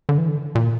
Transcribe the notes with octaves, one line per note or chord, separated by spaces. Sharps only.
D3
E3
D3
A#2